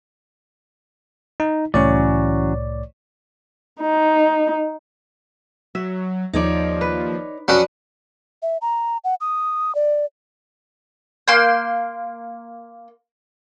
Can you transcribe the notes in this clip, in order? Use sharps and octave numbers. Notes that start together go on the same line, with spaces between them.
D#4
C2 A2 E3 F#3 C#4 C#5 D5
D#4
F#3 E5
D#2 F3 D#4 C#5 D5
B4
F2 F#3 C#4 D4 F#4 B4 D#6 C#7
E5
A#5
F#5
D#6
D5
A#3 C6 G6